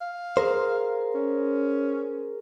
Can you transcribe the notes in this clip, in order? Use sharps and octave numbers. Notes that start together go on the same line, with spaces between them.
F5
G#4 A#4 C5
C#4